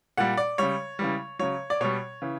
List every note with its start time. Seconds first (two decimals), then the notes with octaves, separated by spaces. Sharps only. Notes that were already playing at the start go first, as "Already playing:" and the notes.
0.17 A#2 G3 F#5
0.37 D5
0.58 C#3 G3 C#5
0.99 C#3 E3 G3
1.39 C#3 F#3 C#5
1.70 D5
1.81 B2 G3 C#5
2.22 C#3 E3